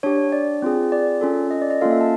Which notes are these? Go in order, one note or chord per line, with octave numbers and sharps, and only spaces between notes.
D4 G4 C#5
D5
C4 F4 G#4
D5
C#4 F4 A4
D#5
D5
D#5
A#3 C#4 F4 A4 F5
E5
A5